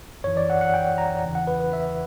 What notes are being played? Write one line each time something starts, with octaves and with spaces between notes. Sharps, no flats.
F#2 E3 C#5
D5
F#5
F#5
G5
A#5
E2 C#3 E3
F#5
B4
B4
E5